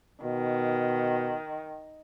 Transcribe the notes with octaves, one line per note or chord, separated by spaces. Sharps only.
B2 D#3